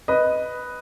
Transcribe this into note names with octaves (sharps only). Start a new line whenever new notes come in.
B4 D#5